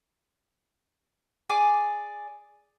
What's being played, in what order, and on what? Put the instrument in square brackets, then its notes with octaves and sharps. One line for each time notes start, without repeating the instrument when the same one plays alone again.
[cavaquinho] G#4 D5 G#5 D6